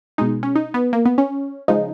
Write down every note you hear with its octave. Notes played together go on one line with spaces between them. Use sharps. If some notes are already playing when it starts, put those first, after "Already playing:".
B2 G#3 D#4
C#4
D#4
B3
A#3
B3
C#4
C#3 F3 G#3 D#4